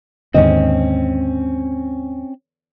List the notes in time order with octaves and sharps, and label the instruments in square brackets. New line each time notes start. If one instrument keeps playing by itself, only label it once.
[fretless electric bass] D#2 G#2 D3 [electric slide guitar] C4 C#4 [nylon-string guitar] D#5